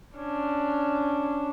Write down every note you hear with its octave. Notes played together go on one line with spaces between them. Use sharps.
C#4 D4